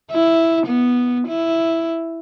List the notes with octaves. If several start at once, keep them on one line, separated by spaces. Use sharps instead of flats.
E4
B3
E4